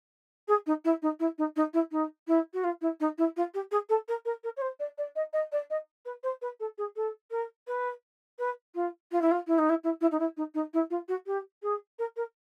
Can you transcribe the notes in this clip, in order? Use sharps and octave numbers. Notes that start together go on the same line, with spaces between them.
G#4
D#4
E4
D#4
E4
D#4
D#4
E4
D#4
E4
F#4
F4
E4
D#4
E4
F4
G4
G#4
A4
A#4
A#4
A#4
C#5
C5
D5
D5
D#5
D#5
D5
D#5
B4
C5
B4
A4
G#4
A4
A#4
B4
B4
F4
F4
E4
F4
E4
D#4
E4
E4
E4
D#4
E4
D#4
D#4
E4
F4
F#4
G4
G#4
A#4
A#4